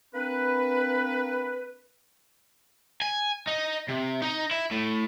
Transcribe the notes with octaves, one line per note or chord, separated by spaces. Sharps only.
A#3 C4 D4 B4
G#5
D#4
C3
D#4
E4
A2